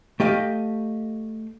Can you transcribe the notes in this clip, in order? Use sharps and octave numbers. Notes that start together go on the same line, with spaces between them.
A3 G4 D#5 F5